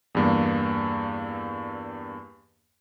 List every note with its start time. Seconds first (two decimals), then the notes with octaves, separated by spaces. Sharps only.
0.15 E2 G2 A#3